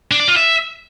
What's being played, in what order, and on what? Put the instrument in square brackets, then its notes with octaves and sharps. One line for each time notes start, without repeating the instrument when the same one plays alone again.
[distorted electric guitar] D4
D5
F4
E5